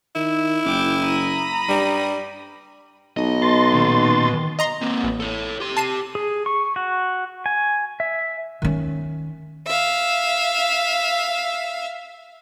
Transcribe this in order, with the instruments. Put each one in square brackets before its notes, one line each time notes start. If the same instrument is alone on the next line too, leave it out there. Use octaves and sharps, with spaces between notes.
[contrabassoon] D#3 [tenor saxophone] E4
[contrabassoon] F#1 [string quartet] G5 D6 F6
[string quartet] A#5 B5 D#6
[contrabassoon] G2 [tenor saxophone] G3
[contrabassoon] B1 [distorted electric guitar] D#5
[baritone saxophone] B2 [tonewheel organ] C6 A6
[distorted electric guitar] A#2 D#3
[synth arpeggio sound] D#5 A#5 C6
[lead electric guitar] A#3 C4
[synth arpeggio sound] A1
[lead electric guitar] A4 C#5
G4 C6
[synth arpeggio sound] A5 C7 D#7
[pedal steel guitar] G#4
C#6
F#4
G#5
E5
[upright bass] D#3 C#4
[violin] E5 F5